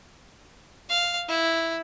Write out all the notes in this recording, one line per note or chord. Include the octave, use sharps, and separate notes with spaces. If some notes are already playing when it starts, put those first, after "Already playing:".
F5
E4